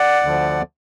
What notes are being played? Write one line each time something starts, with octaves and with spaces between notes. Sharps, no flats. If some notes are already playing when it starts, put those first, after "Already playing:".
Already playing: D5 F#5
D2 D3 F3